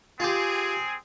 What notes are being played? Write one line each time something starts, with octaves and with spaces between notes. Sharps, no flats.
C4 F4 G4 G#4